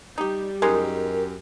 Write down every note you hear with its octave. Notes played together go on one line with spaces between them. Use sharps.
G3 D#4 G4
F#2 G#3 D#4 G4 A#4